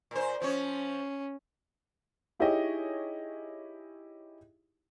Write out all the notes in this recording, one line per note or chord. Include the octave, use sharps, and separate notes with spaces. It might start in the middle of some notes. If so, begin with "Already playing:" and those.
A#2 C5
F3 C#4 C#5
D#4 E4 G4 G#4 C#5 D#5